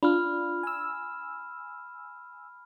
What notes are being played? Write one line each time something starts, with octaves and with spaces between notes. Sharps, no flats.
D4 F4 B5 F6
G#5 E6